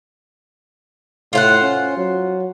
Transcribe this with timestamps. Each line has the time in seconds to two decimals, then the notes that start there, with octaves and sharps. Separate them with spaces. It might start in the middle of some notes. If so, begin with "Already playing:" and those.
1.33 A2 F4 C5 F#5
1.62 C#4
1.97 F#3